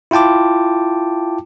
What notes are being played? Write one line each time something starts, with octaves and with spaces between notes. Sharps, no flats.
E4 F4 G5 A5 D6